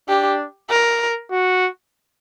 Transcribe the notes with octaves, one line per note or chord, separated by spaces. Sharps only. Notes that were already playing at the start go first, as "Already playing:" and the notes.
D4 G4
A#4
F#4